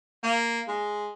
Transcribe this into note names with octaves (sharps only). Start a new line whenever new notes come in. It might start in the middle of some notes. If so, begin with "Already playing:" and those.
A#3
G#3